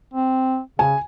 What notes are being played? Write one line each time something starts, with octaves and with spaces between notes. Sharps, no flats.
C4
C#3 G#5